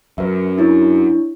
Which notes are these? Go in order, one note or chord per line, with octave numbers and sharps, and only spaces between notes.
F#2 B4 E5
D4 E4 C#5